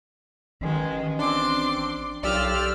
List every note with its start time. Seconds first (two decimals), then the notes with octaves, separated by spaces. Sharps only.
0.61 A1 D#3 G#3
1.19 C4 D4 C6 D6
2.23 B1 F4 G4 D5 E6 F6